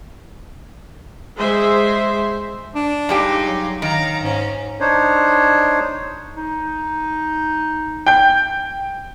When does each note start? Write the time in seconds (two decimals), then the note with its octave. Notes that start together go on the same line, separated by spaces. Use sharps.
1.37 G#3 C5 E5
2.75 D4
3.09 G2 G#3 D#4 G4 F5
3.47 F#3
3.82 D#3 F5 A#5
4.22 G#2 C#4
4.80 D4 D#4 C5 C#5
6.36 D#4
8.07 G5 G6